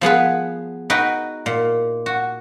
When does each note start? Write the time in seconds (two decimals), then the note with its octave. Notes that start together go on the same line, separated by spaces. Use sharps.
0.01 F3 B3 G#4 B4
0.90 D#4 F#4 B4 G5
1.46 A#2
2.06 F#4